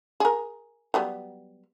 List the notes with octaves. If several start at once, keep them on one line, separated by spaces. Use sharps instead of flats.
G#4 A#4
F#3 G3 B3